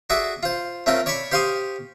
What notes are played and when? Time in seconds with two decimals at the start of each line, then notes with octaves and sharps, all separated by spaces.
0.10 F#4 G#4 A4 D5 E5
0.43 F4 C5
0.86 A3 C4 C#4 F4 A4 A#4
1.06 C#5 D5 A5 B5 C#6
1.32 G4 C5 F5 C6 C#6 D#6